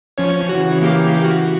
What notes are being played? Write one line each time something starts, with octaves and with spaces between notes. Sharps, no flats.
F3 C#4 C#5
C#3 E3 F#4
A#3 G4 F5
F#4